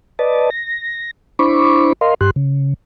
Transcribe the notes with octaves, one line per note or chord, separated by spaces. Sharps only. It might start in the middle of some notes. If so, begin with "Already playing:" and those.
B4 D5 D#5 A5
A#6
D4 E4 C5 B5 C#6 D6
A#4 D#5 F5 C6
G2 G4 C6 F#6
C#3